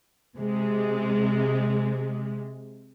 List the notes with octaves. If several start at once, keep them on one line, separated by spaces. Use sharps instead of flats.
C3 G#3